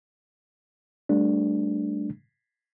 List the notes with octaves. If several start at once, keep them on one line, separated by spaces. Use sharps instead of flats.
G3 A3 D4